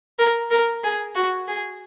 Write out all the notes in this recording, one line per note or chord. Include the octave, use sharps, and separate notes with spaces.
A#4
A#4
G#4
F#4
G#4